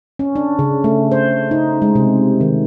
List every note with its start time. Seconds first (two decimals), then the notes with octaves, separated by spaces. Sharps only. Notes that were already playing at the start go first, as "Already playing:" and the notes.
0.19 C#4
0.36 D4
0.59 C#3
0.84 A3
1.11 C5
1.51 D#4
1.82 G#3
1.95 C3
2.41 D#3